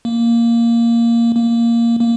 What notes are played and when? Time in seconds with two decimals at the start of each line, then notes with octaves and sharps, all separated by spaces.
0.05 A#3
1.35 A#3
2.00 A#3